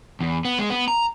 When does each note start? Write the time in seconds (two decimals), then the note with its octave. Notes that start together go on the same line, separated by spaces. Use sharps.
0.21 E2
0.45 B3
0.59 G#3
0.70 B3
0.88 A#5